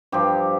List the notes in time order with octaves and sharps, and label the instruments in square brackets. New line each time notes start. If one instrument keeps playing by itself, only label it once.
[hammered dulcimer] G2 F3 G4